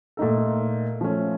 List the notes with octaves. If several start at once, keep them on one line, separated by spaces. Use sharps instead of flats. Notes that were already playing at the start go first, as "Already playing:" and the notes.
A#2 A3 D#4 A4
F3 A3 C#4